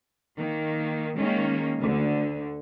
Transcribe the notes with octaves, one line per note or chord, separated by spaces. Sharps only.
D#3 A#3
D#3 G#3 A#3 C#4
D2 D3